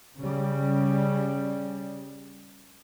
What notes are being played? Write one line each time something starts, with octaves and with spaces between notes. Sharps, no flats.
C#3 G3